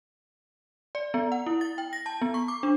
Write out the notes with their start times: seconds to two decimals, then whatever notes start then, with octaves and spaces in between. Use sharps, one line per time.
0.95 D5
1.14 B3
1.32 F#5
1.46 E4
1.61 A6
1.78 G5
1.93 A#6
2.06 A5
2.22 B3
2.34 C#6
2.48 D6
2.63 D4